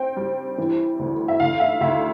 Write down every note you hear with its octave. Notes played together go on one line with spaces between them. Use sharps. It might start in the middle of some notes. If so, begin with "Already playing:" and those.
Already playing: C4 G5
G3
E3
D2
E5
D2 F5
E5
D2 E5